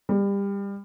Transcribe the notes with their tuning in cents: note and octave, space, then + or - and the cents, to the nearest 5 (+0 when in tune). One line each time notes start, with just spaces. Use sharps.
G3 +25